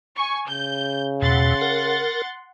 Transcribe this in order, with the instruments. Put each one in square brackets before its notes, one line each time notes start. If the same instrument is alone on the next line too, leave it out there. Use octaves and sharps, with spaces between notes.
[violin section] G#5 C#6
[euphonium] C#3 [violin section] G6
[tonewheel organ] E2 B2 [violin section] F#5 C6 A6
[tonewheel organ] A#4